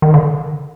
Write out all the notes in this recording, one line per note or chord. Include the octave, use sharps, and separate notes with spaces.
D#3
D3